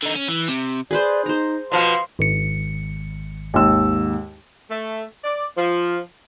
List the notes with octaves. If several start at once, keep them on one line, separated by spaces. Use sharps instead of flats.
D3 D#4
C#4
E3
C3
G#4 B4 C5 D5
D#4 C5 A#5
B2 F3 F5 C6
G#1 C#7
D#2 G#2 E6
A3
D5
F3